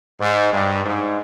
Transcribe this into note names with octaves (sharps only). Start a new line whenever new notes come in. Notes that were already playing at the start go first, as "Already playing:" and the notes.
G#2
G2
G#2